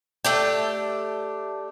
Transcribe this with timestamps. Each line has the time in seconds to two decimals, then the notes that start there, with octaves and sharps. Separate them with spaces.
0.25 A3 D4 G4